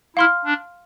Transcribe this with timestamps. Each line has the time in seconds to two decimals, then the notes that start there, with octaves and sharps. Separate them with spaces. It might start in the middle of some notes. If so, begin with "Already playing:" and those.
0.16 E4 F5 C6 F6
0.45 D4